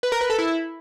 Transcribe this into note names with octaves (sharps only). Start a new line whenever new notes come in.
B4
A#4
B4
A4
E4